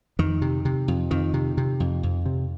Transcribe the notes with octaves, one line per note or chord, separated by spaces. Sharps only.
F2 D#3
C3
C3
F2
F2 D#3
C3
C3
F2
F2
C3